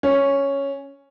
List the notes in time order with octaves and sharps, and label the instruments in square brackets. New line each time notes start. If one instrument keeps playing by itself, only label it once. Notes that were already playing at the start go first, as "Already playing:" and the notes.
[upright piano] C#4